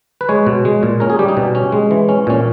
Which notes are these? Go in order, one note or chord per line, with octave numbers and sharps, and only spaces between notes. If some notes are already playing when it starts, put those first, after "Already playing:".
B4
G#3 C#5
B2
G#3
A#2
C#4 A#4
G#4
G3 G4
D#4
B2
C#4
G#3
E3
C#4
A#2 C#4